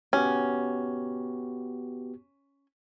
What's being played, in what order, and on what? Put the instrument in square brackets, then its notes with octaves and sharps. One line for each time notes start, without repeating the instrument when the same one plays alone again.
[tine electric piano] B3 F#4 G4 [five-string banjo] C#4